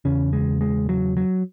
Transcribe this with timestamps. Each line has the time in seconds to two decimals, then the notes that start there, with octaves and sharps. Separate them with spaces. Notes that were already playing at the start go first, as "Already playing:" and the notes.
0.05 E2 C#3 C#4
0.33 G#3
0.61 G#3
0.89 F#3
1.17 F#3